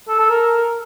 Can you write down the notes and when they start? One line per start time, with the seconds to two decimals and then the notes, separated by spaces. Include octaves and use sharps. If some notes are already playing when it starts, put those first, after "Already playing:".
0.09 A4
0.19 A4
0.30 A#4